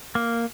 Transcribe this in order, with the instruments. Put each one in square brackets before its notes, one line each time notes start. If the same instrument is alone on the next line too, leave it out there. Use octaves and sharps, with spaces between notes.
[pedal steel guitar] A#3